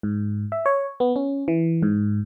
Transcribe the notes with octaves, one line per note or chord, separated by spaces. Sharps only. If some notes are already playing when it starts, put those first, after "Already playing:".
G#2
E5
C#5
B3
C#4
E3
G#2